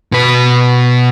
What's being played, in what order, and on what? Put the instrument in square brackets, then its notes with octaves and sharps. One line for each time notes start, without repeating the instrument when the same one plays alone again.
[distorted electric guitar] B2 B4